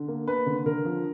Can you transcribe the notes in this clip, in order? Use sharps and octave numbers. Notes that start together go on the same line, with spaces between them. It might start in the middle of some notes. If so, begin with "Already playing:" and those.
Already playing: D3
A#3
A#3 B4
D3
D3 A#4
F3